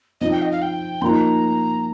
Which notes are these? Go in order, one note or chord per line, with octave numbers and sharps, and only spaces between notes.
F3 C4 D#4 D#5
G5
D#5
F5
G5
F3 A#3 D#4 A#5 C6